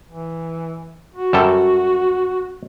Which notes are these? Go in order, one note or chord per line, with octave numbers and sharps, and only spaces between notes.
E3
F#4
F#2 G3 A4